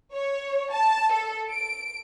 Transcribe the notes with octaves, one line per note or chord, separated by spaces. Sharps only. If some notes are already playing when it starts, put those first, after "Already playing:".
C#5
A5
A4
D7